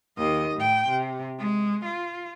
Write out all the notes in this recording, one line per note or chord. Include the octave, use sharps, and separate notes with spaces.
D#2 D#5
A2 G5
C3
G#3
F4